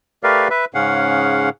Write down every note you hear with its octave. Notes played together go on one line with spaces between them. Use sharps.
A3 G4 A#4 B4 D5 F5
B4 E5
G#2 C#3 C#4 F5 F#5